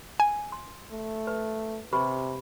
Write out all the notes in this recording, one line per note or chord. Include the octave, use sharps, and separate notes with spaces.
G#5
C6
A3
B4
C3 G4 B4 B5